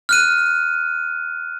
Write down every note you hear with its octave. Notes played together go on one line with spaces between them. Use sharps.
F6 F#6 D#7